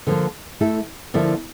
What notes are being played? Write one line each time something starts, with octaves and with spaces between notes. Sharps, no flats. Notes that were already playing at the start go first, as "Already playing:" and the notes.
D3 F3 A#3
A3 E4 A4
D3 F3 A#3 E4